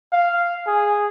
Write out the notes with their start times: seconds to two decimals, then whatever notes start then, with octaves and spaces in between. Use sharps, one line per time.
0.13 F5
0.67 G#4